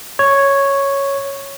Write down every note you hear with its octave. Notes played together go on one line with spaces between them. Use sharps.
C#5